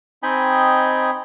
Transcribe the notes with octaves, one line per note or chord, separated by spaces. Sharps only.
C4 D#4 D#5 G5 G#5 B5